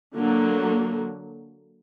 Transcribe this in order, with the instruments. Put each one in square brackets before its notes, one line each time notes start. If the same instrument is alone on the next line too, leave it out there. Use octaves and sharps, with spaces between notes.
[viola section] D3 F#3 A#3